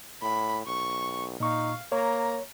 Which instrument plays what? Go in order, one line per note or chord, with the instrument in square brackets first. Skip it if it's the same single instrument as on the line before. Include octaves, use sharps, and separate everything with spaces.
[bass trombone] A2 [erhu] B5
[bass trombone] B1 [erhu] C#6
[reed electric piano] A#2 C#6 [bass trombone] D#4 [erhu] F5
[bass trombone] A#3 [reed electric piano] C#5 [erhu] A#5